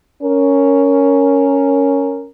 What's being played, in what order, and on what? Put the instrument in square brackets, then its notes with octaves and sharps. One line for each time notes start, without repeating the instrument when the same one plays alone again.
[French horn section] C#4 A#4